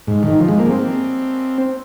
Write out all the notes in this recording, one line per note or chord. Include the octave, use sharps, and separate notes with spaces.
G#2
D#3
F3
G#3
A#3
C4